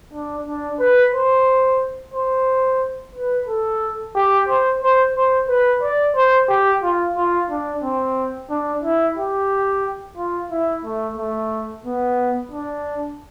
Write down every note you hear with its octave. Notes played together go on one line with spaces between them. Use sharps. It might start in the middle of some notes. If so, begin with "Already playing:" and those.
D4
D4
B4
C5
C5
B4
A4
G4
C5
C5
C5
B4
D5
C5
G4
F4
F4
D4
C4
D4
E4
G4
F4
E4
A3
A3
B3
D4